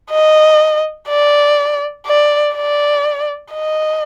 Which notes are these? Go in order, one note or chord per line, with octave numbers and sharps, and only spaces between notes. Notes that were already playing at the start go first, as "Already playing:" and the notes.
D#5
D5
D5
D5
D#5